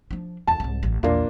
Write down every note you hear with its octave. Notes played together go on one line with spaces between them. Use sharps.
F3 D4
E2 D#4 A5
C2 G#2
A1
A#1 E2 A#3 D4 F4